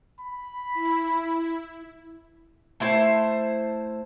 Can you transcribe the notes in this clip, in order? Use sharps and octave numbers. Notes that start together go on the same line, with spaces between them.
B5
E4
A3 E4 C5 A5